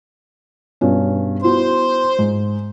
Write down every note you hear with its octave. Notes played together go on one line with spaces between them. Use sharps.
G2 B2 C#4
B3 E4 F#4 C5 C6
G#2